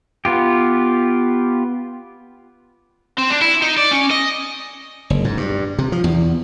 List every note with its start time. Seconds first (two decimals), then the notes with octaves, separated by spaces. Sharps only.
0.25 B3 F4 G4
3.18 C4
3.30 D4
3.42 E4
3.62 D#4
3.78 D5
3.92 C#4
4.11 D#5
5.10 F#1
5.24 G#2
5.37 G2
5.78 C3
5.92 F3
6.04 E2